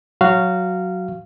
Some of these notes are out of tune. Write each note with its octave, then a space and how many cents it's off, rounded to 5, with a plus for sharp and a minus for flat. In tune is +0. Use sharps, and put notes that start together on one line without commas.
F#3 -5 F#4 +0 F5 -15